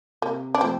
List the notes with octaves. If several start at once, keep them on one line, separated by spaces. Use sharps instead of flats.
C3 A#3
D4
F3 A3 C4